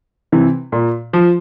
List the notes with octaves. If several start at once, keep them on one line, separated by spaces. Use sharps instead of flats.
C3 E3
A#2
F3